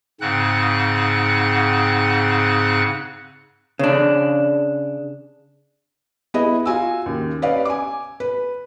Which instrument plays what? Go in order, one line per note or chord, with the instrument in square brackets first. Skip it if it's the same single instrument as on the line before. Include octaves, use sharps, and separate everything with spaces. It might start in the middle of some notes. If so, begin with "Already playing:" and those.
[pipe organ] G#2 C#3 C4 F#5 F#6
[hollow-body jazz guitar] C#3 D4
[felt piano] B3 E4 G#4 B4 D#5
F4 F#4 G#5 E6
D#2 C#3
C#4 B4 D5 D#5 F5
G#5 D6
B4